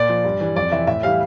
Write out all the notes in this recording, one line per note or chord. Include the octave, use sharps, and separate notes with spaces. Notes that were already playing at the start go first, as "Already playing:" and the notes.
Already playing: A#2 D5
F3
G2
E3 G3
F2 D5
C3 E3 E5
A2 E5
E3 G3 F5